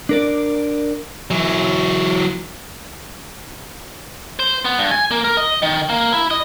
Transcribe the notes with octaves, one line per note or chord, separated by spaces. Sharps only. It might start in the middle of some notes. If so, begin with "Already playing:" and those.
D4 A#4 D5
E3 F#3
C5
B3
G2
G#5
A#3
A#4
D#5
D#3
A#3
E4
D#5